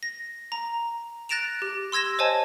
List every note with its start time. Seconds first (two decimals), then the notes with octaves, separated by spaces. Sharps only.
0.03 A#6
0.52 A#5
1.29 F#6 A6 A#6 D7 E7 F7
1.62 G4
1.92 C6 E6 G#6 A#6 E7
2.19 C5 C#5 D#5 G#5 A5